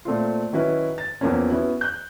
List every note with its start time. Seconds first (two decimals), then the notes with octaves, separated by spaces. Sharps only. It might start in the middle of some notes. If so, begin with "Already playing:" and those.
0.05 A#2 A3 C4 F4
0.53 D#3 F#3 C#4 E4 F#4 B4
0.98 A6
1.21 E2 F3 A#3 C4 C#4
1.50 B3 C#4 E4 F#4
1.81 F#6 G6